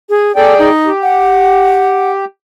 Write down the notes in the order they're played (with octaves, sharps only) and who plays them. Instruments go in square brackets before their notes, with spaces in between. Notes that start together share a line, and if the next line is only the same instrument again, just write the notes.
[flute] G#4
[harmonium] G#4 D5 G5 [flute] A4
[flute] D#4
[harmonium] G4
[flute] F#5